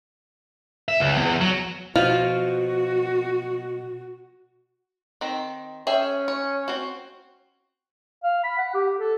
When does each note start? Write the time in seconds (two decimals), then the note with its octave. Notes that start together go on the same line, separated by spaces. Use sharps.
0.88 E5
1.00 C#2
1.18 E2
1.41 F#3
1.95 B2 F3 F4 F#4
5.21 D#3 C4
5.87 C#4 G#4 E5 G5
6.28 C#5
6.68 C4 F#4
8.24 F5
8.43 B5
8.58 F#5
8.74 G4
8.98 A4